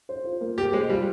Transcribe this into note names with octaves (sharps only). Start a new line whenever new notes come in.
C5
F4
A#3
A#3 G4
G#3 C5
G3 F4